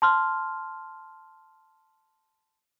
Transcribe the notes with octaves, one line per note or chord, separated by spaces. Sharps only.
A5 C6 F6